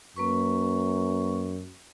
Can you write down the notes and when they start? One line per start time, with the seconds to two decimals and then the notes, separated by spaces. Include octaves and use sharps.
0.16 F#2 A#3 B4 C#6